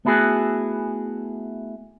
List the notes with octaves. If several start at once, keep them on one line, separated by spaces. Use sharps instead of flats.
A3 B3 E4 F#4 G#4